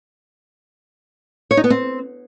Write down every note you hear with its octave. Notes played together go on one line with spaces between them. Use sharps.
C#5
D#4
B3
C4